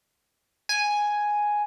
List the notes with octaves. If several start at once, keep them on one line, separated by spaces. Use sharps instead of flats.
G#5